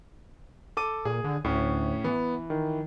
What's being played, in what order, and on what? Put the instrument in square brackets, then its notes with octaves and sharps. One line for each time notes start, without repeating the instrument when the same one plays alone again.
[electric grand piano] A4 D6 D#7
[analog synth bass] A#2 [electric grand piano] G#4
[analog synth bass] D3
[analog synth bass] D2 [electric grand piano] A2 C#4
[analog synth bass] E3 [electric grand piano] B3
[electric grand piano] D#3